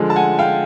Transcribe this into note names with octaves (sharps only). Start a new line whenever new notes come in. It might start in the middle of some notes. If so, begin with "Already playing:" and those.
Already playing: D3 F3 G#3
A5
F#5 G#5
F5 G5